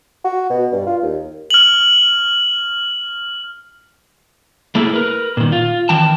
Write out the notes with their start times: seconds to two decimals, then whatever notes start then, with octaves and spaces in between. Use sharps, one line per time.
0.24 F#4
0.50 B2
0.72 G2
0.87 F4
1.02 D#2
1.50 F6 F#7
4.75 A3 A#3 E4 G#4
4.94 A#4 B4
5.37 A#2 D#3
5.52 F4
5.89 D#3 E3 G5 A5